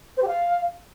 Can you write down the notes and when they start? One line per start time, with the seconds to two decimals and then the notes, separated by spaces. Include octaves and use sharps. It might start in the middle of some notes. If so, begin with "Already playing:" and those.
0.17 C5
0.22 G4
0.27 F5